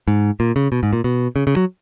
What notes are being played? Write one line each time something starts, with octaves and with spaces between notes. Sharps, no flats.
G#2
A#2
C#3
B2
G#2
A#2
B2
C#3
C#3
F#3